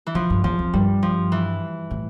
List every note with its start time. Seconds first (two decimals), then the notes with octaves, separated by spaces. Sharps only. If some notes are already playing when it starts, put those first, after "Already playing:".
0.07 E3
0.15 D3 F3
0.30 G2
0.44 E2 F3
0.59 F2
0.73 G2 G3
1.03 F3
1.32 E3
1.91 A2